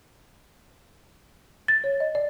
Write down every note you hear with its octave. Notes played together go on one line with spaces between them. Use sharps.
A6
C#5
D#5
D5